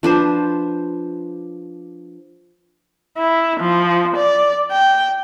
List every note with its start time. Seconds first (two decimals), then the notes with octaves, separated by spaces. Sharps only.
0.03 F3 D4 B4 C5
3.17 E4
3.60 F3
4.17 D5
4.71 G5